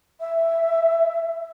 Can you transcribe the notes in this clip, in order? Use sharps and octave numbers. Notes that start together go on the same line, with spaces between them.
E5